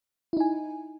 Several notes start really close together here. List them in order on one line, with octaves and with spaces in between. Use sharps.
E4 D#4 G#5